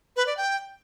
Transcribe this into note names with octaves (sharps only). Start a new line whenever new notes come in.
B4
D5
G5